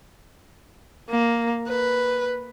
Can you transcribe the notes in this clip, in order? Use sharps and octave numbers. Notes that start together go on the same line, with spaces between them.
A#3
B4